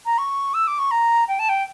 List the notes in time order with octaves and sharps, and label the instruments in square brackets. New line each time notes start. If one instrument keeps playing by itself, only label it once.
[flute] A#5
C#6
E6
D6
C#6
A#5
G5
A5
G5